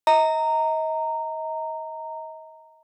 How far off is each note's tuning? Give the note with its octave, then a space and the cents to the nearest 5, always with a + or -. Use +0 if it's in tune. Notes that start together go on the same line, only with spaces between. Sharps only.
D#5 +35 A#5 -15